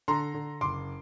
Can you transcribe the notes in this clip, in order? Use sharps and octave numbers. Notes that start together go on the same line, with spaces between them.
D3 A#5 C6
D3
F#1 C6 D6